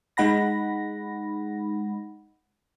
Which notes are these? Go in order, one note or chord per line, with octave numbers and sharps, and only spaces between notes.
G#3 D#4 F#5 B5 A#6